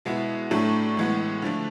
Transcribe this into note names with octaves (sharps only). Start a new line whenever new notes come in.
B2 G#3 B3 E4
A2 F#3 A3 D4
A2 E3 G#3 B3
D3 F3 A3 D4